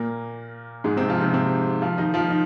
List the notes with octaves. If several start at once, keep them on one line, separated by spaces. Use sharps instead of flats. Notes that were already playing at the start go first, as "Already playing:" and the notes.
Already playing: A#2 A#3
G#2 G#3
C3 C4
F3 F4
C3 C4
C3 C4
F3 F4
D#3 D#4
F3 F4
D#4